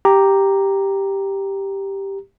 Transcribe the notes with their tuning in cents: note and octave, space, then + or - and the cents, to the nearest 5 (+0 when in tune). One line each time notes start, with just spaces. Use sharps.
G4 +0 A#5 +0